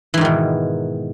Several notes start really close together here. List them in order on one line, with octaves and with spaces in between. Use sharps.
E3 G#2 D#3 B2